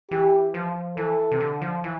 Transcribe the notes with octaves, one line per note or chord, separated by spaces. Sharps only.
E3 G4
F3
E3 A4
C3
D3
F3
E3